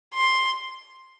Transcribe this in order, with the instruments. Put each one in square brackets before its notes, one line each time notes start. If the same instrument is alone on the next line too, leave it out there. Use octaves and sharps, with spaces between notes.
[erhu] C6